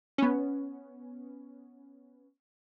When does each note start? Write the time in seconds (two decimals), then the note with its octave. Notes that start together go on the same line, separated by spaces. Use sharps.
0.18 B3 C#4